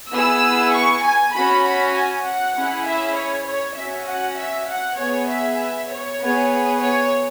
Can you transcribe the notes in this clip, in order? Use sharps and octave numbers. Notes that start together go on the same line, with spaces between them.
B3 E4 G#4 E6
C#6
G#5
C#4 F#4 B5
B5
G#5
F#5
C#4 E4 G#4
E5
C#5
C#5
C#4 F#4 E5
F#5
E5
F#5
B3 G#4 C#5
E5
C#5
B3 G#4
C#5